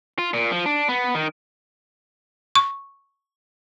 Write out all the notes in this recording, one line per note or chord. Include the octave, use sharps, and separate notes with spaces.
F4
A#2
F3
D4
B3
D#3
C#6